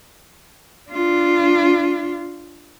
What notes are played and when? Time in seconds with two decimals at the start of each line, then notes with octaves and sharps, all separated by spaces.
0.90 D4 F4